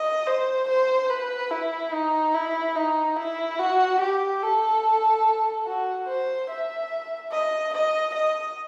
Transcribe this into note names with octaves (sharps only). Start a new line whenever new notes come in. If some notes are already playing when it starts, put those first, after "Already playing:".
Already playing: D#5
C5
C5
B4
E4
D#4
E4
D#4
E4
F#4
G4
A4
F#4
C5
E5
D#5
D#5
D#5